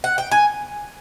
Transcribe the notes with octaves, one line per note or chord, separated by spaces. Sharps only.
F#5
G5
G#5